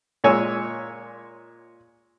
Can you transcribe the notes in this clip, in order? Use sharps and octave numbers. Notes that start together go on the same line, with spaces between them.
A#2 G#3 C#5 G#5 E6